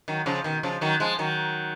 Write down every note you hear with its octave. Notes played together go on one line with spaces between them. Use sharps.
D#3 F#3
C#3 F3
B2 D#3
C#3 F3
D#3 F#3
F3 G#3
D#3 F#3